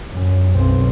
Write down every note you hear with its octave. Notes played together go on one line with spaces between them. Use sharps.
F#2
B1 C4